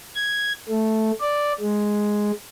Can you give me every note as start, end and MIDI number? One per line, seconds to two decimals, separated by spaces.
0.15 0.52 92
0.69 1.11 57
1.21 1.53 74
1.60 2.31 56